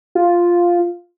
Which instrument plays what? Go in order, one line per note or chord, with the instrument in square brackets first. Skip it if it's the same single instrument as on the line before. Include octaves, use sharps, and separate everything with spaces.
[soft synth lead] F4